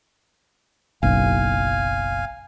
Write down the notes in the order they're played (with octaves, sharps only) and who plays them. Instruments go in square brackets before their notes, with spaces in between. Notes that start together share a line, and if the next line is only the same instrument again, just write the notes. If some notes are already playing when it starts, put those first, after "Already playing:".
[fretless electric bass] F#1 B1 [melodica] F5 G#5